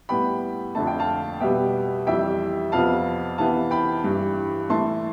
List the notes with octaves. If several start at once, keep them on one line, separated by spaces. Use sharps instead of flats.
A2 G3 B3 G5 B5
F2 D3 A3 A5
G5
F5 A5
B2 G3 B3 E5 G5
F2 E3 G3 E5 G5
F2 C3 F3 B3 F5 A5
C3 E3 B3 F5 A5
G5 B5
G2 E3 G3
A2 E3 A3 A5 C6